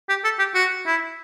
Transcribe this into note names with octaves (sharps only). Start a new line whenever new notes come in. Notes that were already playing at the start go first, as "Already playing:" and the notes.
G4
A4
G4
F#4
E4